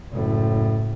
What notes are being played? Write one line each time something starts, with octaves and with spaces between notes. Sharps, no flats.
F#1 A2